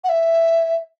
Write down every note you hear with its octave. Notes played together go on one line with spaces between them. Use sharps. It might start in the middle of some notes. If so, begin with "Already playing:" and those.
F#5
E5